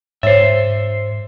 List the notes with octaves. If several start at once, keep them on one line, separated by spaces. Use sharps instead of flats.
G#2 C5 C#5 E5